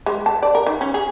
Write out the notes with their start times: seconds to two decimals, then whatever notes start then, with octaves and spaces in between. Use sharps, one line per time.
0.06 G#3
0.26 A5
0.43 D5
0.55 A#4
0.67 D#3
0.81 C#4
0.94 G#4